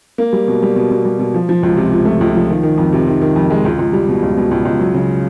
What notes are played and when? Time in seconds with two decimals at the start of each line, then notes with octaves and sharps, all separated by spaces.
0.18 A#3
0.33 G3
0.48 B2
0.62 G3
0.76 B2
0.91 B2
1.05 G3
1.19 B2
1.34 F3
1.49 F3
1.63 C#2
1.77 C3
1.92 C#2
2.05 A3
2.21 C#2
2.35 F3
2.50 D#3
2.63 D#3
2.78 F2
2.93 C3
3.07 D#3
3.22 D#3
3.36 F2
3.50 G#3
3.65 C#2
3.79 C#2
3.93 G3
4.08 B2
4.22 C#2
4.37 B2
4.51 C#2
4.65 C#2
4.80 F#3
4.94 C#3